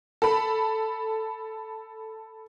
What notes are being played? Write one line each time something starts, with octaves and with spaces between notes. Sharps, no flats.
A4 B5